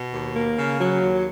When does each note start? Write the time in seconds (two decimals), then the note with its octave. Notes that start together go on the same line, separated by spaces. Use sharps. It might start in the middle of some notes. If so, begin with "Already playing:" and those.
Already playing: B2
0.13 D#2
0.36 A#3
0.58 C#3
0.79 F#3
1.01 D#2